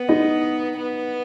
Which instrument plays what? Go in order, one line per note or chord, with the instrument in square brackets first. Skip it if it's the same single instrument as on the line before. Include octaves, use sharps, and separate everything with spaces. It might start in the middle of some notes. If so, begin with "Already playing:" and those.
Already playing: [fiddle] B3
[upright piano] D#4 D#5
[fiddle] B3